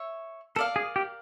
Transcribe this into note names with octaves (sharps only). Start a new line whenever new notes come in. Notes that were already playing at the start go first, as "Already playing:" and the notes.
Already playing: C#5 E5
A4 A#4 D5 F5
G#4
G4